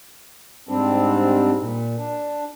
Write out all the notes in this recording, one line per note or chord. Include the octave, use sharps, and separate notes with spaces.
G#2 G3 C4 D4
A#2
D4